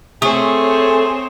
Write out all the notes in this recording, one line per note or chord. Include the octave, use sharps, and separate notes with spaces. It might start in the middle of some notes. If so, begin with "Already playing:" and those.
A3 C4 G#4 C5 C#5 D#6